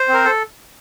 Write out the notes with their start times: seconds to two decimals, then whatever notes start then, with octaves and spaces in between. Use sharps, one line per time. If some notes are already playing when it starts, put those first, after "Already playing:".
Already playing: C5
0.09 C4 A#4
0.25 A4